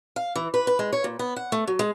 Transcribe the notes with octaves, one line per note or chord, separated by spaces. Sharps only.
F5
E3
B4
B4
G#3
C#5
A#2
B3
F#5
A3
F#3
G#3